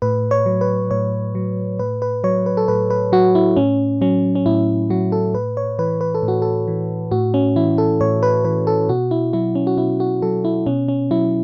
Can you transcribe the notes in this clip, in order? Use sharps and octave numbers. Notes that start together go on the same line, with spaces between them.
A2 B4
C#5
F#3
B4
A2 C#5
F#3
A2 B4
B4
F#3 C#5
B4
A4
A2 B4
B4
F#3 F#4
E4
A2 C#4
F#3 C#4
C#4
A2 E4
F#3 F#4
A4
A2 B4
C#5
E3 B4
B4
A4
A2
F#4
A4
E3
A2 F#4
C#4
E3 E4
A4
A2 C#5
B4
E3 B4
A4
B2 F#4
E4
F#3 E4
C#4
F#4
B2 E4
F#4
F#3 A4
E4
B2 C#4
C#4
F#3 E4